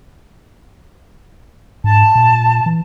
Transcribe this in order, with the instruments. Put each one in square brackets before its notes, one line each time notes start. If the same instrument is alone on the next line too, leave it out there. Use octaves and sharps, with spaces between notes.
[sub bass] G#2 [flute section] A5
[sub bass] A#2
E3